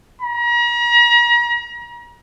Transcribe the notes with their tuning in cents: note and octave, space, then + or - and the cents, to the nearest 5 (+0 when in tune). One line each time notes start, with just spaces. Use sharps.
A#5 +40